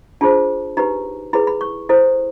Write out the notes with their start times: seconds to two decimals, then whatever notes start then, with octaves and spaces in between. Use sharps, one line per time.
0.21 D4 F4 G#4 C5 A5
0.77 D#4 G4 B4 A#5
1.33 E4 G#4 B4 B5
1.47 B5
1.61 C#6
1.89 E4 A4 C5